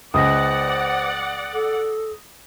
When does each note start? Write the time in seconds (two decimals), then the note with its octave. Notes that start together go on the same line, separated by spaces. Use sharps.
0.14 C#2 C5 D5 F#5 D#6 A#6
1.53 A4